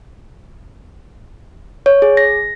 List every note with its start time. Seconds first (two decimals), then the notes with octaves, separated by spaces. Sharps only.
1.86 C#5
2.02 G#4
2.17 A#6